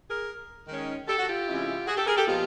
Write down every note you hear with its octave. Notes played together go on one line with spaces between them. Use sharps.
G#4 A#4
D#3 G#3 C#4
G4 A4
F#4
F4 G4
C3 E3 G#3 C#4 E4
F#4 G#4
G4 A4
G#4 A#4
G4 A4
A#2 F3 G#3 B3 F4 G4